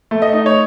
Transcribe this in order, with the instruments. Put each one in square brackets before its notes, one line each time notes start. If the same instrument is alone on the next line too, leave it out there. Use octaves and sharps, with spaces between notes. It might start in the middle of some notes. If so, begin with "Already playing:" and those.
[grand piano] A3
D#5
D#4
C#5